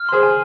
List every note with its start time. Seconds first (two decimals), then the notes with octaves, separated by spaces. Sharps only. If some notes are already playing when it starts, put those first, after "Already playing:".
Already playing: F6
0.09 G#4 C5 C6
0.23 G#5